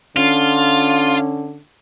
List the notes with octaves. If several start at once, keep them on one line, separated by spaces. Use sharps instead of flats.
D3 C#4 F4